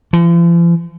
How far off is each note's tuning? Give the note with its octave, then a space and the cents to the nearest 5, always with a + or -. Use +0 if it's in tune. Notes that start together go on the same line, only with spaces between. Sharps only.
F3 -45